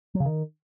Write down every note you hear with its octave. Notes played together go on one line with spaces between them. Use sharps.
F#3
C#3
D#3